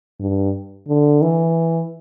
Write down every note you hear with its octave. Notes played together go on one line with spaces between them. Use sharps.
G2
D3
E3